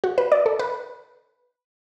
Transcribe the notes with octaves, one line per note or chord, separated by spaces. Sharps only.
F#4
B4
D5
A4
B4